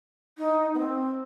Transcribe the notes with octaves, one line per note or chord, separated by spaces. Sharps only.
D#4
B3
C4